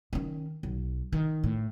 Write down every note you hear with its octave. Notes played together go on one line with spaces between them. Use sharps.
D#3 C#4
B1
D#3
A2